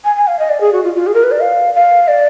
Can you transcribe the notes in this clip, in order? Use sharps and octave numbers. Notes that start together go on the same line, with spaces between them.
G#5
G#5
F5
D#5
D5
G#4
F#4
F4
F4
G#4
A#4
B4
D5
F5
F5
D5